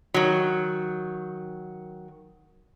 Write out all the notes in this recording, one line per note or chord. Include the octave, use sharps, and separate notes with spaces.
D#3 F#3